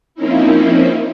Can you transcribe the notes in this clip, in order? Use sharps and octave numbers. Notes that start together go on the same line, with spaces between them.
F3 A#3 C4 C#4 D#4 E4